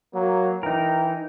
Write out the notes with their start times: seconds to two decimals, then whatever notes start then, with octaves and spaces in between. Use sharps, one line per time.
0.14 F#3 A#3
0.63 E3 D#4 A#4 G5